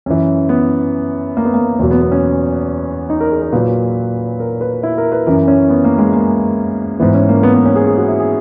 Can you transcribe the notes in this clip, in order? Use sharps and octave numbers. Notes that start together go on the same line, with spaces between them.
F#2 E3 C#4
B3
A#3
B3
A#3
E2 B2 F#3 A#3
B3
B3
C#4
D#4
A#4
G#4
A#4
A#2 F#3 B4
A#4
B4
E4
A#4
B4
F#2 E3 A#4
C#4
B3
A#3
G#3
A#3
G#2 E3 B3
C#4
A#3
B3
B3
C#4
G#4
G#4
F#4
E4
G#4